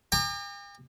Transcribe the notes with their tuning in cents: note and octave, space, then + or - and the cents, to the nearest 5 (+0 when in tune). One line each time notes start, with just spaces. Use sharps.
G5 +45 A#5 -30 D6 +40